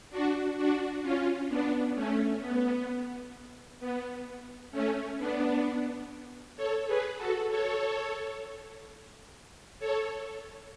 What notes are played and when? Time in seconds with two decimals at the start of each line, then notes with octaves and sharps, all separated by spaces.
0.10 D4 F#4
0.57 D4 F#4
1.02 C#4 F4
1.48 B3 D4
1.95 A3 C#4
2.41 B3
3.80 B3
4.71 A3 C#4
5.18 B3 D4
6.56 A4 C#5
6.87 G#4 B4
7.18 F#4 A4
7.49 A4 C#5
9.79 A4 C#5